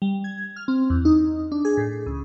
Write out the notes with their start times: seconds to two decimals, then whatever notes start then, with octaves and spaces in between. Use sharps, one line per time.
0.02 G3
0.24 G#6
0.56 F6
0.68 C4
0.90 E2
1.05 D#4
1.52 D4
1.65 G#4
1.77 A2
2.06 C#2